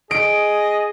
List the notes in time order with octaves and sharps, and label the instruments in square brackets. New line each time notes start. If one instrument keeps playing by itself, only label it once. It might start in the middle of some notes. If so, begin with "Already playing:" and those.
[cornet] G#4 [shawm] D#5 [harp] D7